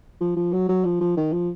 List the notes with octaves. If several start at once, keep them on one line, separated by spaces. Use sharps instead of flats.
F3
F3
F#3
F#3
F3
F3
D#3
F3